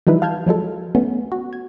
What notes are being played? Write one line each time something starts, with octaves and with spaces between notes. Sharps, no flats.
E3 F3 G3 D#4 E4 B4
F5 A5 F6 G6 G#6
F3 F#3 G#3 A4
A3 B3 C#4
F#4
G#6